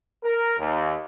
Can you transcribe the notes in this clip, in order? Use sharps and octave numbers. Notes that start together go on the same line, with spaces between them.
A#4
D#2